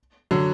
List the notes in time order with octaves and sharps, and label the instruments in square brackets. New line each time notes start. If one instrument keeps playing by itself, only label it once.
[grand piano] D3 F#3